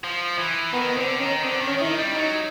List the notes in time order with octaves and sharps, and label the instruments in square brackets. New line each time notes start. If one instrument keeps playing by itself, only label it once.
[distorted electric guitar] F3
E3
[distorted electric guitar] D#3 [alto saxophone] B3
[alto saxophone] B3
[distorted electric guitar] D3 [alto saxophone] C4
[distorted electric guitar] D#3 [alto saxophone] C#4
[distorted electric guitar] D3 [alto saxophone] C4
[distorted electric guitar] D#3
[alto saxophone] C#4
[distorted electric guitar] D#3 [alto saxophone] E4
[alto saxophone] D#4
[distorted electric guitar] G3
[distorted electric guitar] F#3 [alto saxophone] D#4